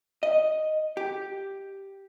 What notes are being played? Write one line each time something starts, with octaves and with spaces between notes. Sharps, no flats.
D#5
G4